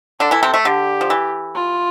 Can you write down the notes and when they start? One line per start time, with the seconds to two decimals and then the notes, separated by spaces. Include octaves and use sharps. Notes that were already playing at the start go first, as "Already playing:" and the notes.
0.20 D3 D4 A4
0.31 E3 E4
0.43 C3 C4
0.54 A3
0.65 D3 G4
1.01 F3
1.10 E3
1.55 F4